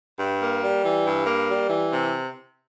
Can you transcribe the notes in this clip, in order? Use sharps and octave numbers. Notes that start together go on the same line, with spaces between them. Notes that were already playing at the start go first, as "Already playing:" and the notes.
G2
A#3
G3
E3
G2
A#3
G3
E3
C3